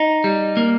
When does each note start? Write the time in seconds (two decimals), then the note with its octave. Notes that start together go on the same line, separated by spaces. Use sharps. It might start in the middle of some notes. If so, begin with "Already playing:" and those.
Already playing: D#4
0.24 G3
0.57 A#3